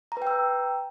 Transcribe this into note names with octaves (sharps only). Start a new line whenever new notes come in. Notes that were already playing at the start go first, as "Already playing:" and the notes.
B4 G5 A#5 E6